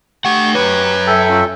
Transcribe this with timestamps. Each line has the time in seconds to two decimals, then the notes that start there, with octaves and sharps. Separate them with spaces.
0.25 A3 G4 F#5 C#6
0.55 F#2 B4 C#5
1.07 A4 E5 G5
1.30 C#4 F4